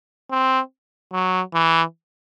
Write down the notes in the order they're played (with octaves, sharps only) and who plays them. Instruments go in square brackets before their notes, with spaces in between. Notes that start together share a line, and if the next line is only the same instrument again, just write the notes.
[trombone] C4
F#3
E3